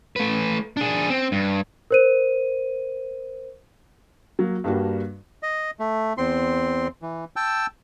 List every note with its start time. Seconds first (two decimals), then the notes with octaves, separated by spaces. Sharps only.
0.16 A3 B4
0.77 D4 G#4
1.10 C4
1.32 G2
1.91 A#4 C5 D#7
4.39 F#3 A#3
4.64 G2 G3 A#3 D4 F#4
5.43 D#5
5.80 A3
6.18 E2 C4 C6
7.02 E3
7.36 G5 A5 E6